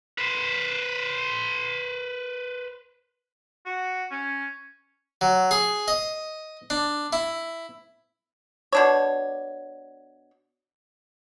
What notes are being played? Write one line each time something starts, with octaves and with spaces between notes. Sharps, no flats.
B4 C5
F#4
C#4
F#3
G#4
D#5
D4
E4
B2 D4 C#5